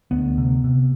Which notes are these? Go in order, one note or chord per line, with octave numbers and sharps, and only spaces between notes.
D2 B3
C3
C3